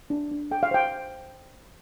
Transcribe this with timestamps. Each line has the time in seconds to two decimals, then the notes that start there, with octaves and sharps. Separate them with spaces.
0.10 D4
0.31 D4
0.51 A4 G5
0.63 F5
0.71 C5 G5